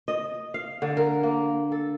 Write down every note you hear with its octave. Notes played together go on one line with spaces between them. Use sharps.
D#5
F5
D3
A#4
A#3
A4